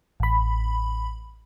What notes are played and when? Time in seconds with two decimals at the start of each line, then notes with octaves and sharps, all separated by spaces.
0.20 A1 B5